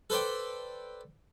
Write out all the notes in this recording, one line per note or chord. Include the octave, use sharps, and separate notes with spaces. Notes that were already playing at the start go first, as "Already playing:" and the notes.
A4 B4 C5 D5 G5